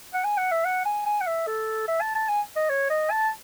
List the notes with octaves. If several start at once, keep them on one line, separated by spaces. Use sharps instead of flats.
F#5
G#5
F#5
E5
F#5
G#5
G#5
F#5
E5
A4
E5
A5
A5
G#5
D#5
C#5
D#5
A5